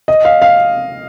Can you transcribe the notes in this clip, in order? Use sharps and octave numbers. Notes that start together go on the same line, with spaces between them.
D#5
F5
F5